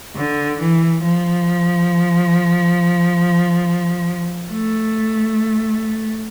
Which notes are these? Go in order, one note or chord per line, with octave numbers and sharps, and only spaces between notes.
D3
E3
F3
A3